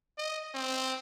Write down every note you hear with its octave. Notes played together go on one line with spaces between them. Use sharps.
D#5
C4